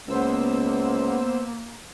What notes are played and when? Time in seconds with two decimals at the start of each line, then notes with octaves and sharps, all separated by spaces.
0.08 C#2 A#3 B3 C5 E6